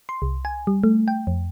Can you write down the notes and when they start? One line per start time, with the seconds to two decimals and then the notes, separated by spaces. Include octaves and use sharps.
0.09 C6
0.22 C2
0.45 G#5
0.67 G3
0.84 A3
1.08 G5
1.27 F2